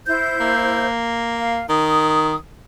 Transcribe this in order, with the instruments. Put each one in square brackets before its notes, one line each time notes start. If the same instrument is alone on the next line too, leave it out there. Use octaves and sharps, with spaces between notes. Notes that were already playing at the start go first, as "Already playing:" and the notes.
[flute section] E4 C5 G6
[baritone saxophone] A#3
[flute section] F5
[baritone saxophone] D#3 [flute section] D#6